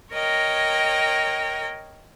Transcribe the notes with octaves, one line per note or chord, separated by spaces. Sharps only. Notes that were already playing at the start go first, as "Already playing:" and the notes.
A#4 C#5 D#5 G5